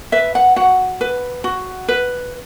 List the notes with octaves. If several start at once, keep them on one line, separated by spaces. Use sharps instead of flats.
B4 E5
F#5
F#4 F#5
B4
F#4
B4